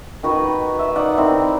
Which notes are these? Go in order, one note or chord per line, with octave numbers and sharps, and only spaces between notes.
D#3 F#4 B4
E5
D#4 A#4 D5 F#5
D#3 C4 E4